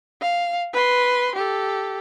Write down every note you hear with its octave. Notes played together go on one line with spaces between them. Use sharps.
F5
B4 C6
G4 A4